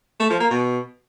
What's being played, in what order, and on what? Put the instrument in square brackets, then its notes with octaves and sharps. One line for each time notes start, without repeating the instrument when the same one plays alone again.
[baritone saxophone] A3
F3
A#3
B2